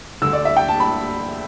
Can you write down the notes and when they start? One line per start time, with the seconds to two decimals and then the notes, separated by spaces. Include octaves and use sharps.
0.22 D2 D3 E6
0.33 D5
0.45 E5
0.56 G5
0.69 A5
0.80 B5